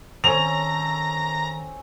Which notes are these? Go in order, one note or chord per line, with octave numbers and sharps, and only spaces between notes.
D#3 C4 C#4 A4 A#5 F7